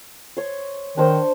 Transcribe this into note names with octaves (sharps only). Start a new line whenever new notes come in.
C#5 C6
D#3 D4 C5 C#6